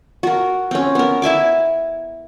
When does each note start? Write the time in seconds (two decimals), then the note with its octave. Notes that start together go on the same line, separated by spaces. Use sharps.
0.23 F#4 A#4
0.71 C4 C#4
0.95 B3 A#4
1.22 E4 E5 G#5 D6